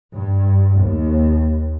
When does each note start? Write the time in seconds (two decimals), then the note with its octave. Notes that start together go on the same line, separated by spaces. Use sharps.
0.15 G2
0.82 D#2